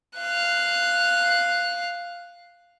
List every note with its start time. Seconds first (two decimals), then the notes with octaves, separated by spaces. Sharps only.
0.18 F5 F#6